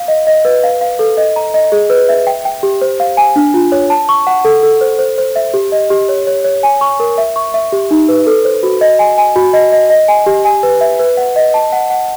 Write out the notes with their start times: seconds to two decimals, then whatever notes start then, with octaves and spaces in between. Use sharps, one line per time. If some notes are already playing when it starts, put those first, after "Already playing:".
Already playing: F5
0.08 D#5
0.27 D#5
0.45 B4
0.64 F5
0.81 F5
0.99 A4
1.17 D#5
1.36 A#5
1.54 D#5
1.72 G#4
1.90 B4
2.09 E5
2.27 G5
2.45 G5
2.63 G4
2.81 C5
3.00 F5
3.17 G#5
3.36 D4
3.54 F4
3.72 C#5
3.90 A5
4.09 C#6
4.27 F#5
4.45 A4
4.63 A4
4.81 C5
4.99 C5
5.18 C5
5.36 E5
5.54 G4
5.72 D#5
5.90 G4
6.09 C#5
6.27 C#5
6.44 C#5
6.63 G#5
6.81 C#6
7.00 A#4
7.18 E5
7.36 C#6
7.54 E5
7.72 G4
7.91 D#4
8.09 B4
8.27 A4
8.45 C5
8.63 F#4
8.81 D#5
8.99 G#5
9.18 G#5
9.36 F#4
9.53 D#5
9.72 D#5
9.90 D#5
10.08 G#5
10.26 G4
10.45 G#5
10.63 B4
10.81 E5
10.99 B4
11.17 F#5
11.36 D#5
11.54 A5
11.72 F#5
11.90 F#5